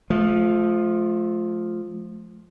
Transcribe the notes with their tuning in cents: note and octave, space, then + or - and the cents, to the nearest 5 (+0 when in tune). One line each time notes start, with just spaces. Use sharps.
F3 +5 A3 -35